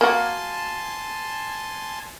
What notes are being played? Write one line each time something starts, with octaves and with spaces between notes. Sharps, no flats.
A#3 F#4 G#5 A5 C6